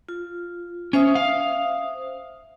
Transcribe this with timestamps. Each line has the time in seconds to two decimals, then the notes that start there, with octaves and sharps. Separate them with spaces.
0.09 F4
0.93 C#4 C5 E5 D#6
1.15 F5